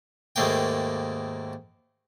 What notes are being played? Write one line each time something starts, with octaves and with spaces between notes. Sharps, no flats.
D#2 G#2 A3 A#3 G5